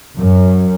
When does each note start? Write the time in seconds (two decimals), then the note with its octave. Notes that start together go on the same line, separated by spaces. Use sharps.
0.17 F#2